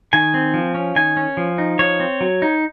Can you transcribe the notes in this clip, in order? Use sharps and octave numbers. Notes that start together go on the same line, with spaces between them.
D#3 G#5
C4
F3
C#4
D#3 G#5
C#4
F3
D#4
F3 C#5
C4
F#3
D#4